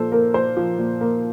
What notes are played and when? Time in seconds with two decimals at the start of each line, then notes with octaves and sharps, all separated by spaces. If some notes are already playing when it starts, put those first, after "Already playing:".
Already playing: A#2 F3 A4 C5
0.12 A#3 A#4
0.34 A#2 C5
0.57 F3
0.79 A#2
1.01 A#3